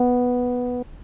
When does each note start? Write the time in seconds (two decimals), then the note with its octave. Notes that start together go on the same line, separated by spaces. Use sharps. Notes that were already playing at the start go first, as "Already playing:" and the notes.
Already playing: B3